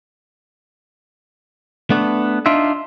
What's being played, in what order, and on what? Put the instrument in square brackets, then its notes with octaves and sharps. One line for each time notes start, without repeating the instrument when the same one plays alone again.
[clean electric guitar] A3 B3 D4
D4 D#4 F4 E5